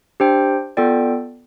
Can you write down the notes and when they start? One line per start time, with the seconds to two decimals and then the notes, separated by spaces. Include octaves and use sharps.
0.20 D4 G4 C5 G5
0.77 B3 F4 A4 D5 G5